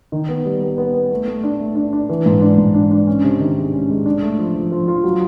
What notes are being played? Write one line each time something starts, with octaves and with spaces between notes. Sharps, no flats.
D#3
B3
G3
B3
B3
B3
A3
A3
D4
A3
D4
D4
E3
G#2
D4
G#2
D4
D4
C#4
C3
D#3
G#3
C#4
G#3
D4
A3
F3
F3
F3
F4
F#3